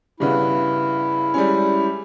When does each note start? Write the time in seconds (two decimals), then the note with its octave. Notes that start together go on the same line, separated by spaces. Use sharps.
0.20 G2 C#3 B3 E4
1.34 G3 G#3 C#4